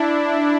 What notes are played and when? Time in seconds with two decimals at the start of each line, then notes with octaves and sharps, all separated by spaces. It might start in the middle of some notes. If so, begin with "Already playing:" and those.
Already playing: D4 E4